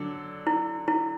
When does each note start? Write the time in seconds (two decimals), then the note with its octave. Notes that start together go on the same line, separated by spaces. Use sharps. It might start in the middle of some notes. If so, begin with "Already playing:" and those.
Already playing: D3 F#3 D4 A4
0.47 E4
0.88 E4